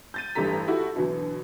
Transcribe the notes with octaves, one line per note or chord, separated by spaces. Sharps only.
G6 A6 D#7
A1 G2 G3 A4 A#5 B6
E4 F#4 G4 A4
B2 D3 E3 F#3